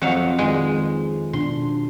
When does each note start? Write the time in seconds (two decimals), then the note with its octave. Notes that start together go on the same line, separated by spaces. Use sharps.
0.02 F2 F#3 F5
0.39 D#3 G#3 D#4 B4
1.33 B2 D4 C6